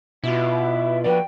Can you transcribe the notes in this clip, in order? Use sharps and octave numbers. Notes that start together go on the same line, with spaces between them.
B2 E4 F4 B4 E5 D6
F3 F#4 B4 D5 G5